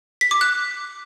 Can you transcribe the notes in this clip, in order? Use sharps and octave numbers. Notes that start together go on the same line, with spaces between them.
B6
D6
F#6